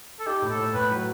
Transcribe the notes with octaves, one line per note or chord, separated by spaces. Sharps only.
A4
D#4 G4
A2
A4
A2
A2 B4
F#3